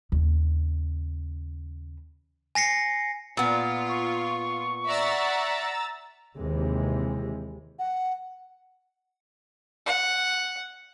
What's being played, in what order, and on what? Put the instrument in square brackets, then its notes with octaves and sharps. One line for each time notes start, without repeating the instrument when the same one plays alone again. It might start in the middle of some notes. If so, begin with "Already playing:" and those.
[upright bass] D#2 C#3
[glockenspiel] G#5 A#6 C7 C#7
[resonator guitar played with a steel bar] A#2 B3 [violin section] F4
[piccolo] C#6
[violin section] D5 E5 F#5 [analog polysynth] A#5 E6 A6
[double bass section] D#2 C3 E3 G#3
[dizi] F#5
[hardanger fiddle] F#5